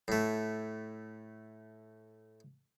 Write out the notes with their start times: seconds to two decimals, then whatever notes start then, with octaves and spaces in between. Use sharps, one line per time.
0.08 A2 A3